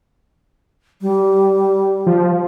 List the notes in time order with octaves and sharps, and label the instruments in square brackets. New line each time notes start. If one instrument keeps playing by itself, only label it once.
[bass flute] G3
[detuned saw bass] F3